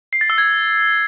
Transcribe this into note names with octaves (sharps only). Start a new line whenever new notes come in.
C7
A6
E6
G#6